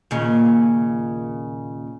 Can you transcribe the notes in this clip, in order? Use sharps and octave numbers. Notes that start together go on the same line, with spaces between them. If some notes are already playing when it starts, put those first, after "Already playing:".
D#2 A#2 C#3